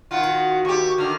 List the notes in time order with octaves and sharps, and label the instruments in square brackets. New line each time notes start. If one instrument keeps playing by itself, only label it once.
[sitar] D#3 F4 [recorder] F#5
[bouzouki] F#4
[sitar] D#2 G4 [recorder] C#6
[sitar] D3 D#3 [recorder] F6